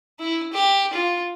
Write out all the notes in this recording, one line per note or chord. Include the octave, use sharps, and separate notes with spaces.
E4
G4
F4